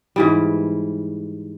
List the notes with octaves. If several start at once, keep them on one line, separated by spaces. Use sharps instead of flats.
G#2 E3 G3